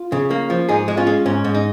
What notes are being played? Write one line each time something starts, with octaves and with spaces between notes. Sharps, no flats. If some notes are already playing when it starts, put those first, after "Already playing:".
Already playing: F4
C#3
A#3
F3
G#2 D#4 G#4
G#3
C#4 F4
G#3
G#2 C#4
G#2
D#4